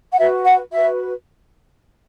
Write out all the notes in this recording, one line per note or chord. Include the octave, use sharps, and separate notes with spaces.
F#5
F#4 B4 E5
F#5
F#4 B4 E5